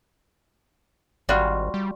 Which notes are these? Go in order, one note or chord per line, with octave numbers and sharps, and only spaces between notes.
G#1 G3 F4 F#4
G3